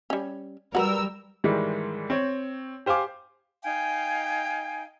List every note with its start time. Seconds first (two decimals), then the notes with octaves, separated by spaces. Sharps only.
0.10 G3 C#4
0.75 G3 F#4 A#4 B4 E6
1.44 G#2 D#3 E3 G3 G#3
2.10 C4 C#5
2.86 G4 C5 F5 G#5 D6
3.63 D#4 F5 G5 G#5